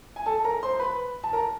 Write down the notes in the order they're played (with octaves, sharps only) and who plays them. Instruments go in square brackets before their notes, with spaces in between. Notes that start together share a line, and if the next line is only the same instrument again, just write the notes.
[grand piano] G#5
A4 A5
A#4 A#5
C5 C6
B4 B5
A5
A#4 A#5